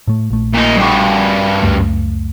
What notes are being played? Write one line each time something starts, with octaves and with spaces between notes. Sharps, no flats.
A2 A3
A#1 A3
A#2 D#4
G2 F#4
C#2 F#2 A3